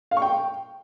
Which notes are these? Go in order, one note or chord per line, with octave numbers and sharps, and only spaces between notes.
F5
C#6
G5